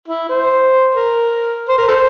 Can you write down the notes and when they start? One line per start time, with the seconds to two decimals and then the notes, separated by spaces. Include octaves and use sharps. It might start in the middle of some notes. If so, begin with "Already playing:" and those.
0.08 E4
0.29 C5
0.95 A#4
1.69 C5
1.78 A#4
1.88 A4 C5